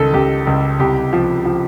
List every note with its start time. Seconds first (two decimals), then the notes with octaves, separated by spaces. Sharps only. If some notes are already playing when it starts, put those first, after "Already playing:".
Already playing: C#2 D#3 A4 D#5
0.14 C#2 G4
0.47 C#2
0.79 C2 G4
1.13 F3
1.45 F3